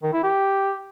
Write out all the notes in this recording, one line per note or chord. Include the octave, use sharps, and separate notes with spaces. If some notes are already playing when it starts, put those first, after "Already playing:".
D#3
E4
G4